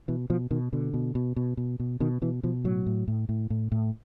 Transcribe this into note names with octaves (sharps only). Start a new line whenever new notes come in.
B2 E3
B2 F3
B2 D#3
B2 D3
B2
B2
B2
B2
B2
B2 D#3
B2 E3
B2 F3
A2 F#3
A2
A2
A2
A2
A2